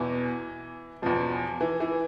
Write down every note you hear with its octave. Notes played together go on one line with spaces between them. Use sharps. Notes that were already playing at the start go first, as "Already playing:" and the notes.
Already playing: E2 B2 E3
E2 B2 F3
E3
E3